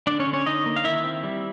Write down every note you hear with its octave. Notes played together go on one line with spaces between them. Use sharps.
D3 D4 D5
C#4 C#5
D3
C#4 C#5
D3 D#4 D#5
A#3
F5
D#3 E4 E5
C4
G3